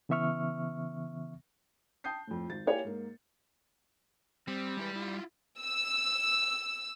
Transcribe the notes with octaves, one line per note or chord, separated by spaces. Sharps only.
C#3 E3 B3 E5 C#6 F6
G5 A5 D#6 G6 C7
F2 A2
G#1 A6
A#3 E4 G4 C#5 F5 G#5
G#2 A#3
G3 C4
G#3 E4 B4
E4 F4
E6